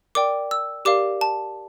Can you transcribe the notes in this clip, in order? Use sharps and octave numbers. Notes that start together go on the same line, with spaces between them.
A#4 D5 G5 D6
E6
G4 A#4 D5 F5 D6
A5